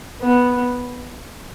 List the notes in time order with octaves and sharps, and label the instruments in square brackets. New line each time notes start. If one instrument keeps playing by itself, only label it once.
[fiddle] B3